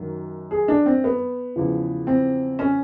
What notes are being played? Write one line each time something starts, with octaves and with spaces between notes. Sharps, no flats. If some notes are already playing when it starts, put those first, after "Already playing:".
Already playing: F#2 D#3 F#3
G#4
D4
C4
B3
E2 C#3 F3
C4
C#4